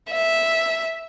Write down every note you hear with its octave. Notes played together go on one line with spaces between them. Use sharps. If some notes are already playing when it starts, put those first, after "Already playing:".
E5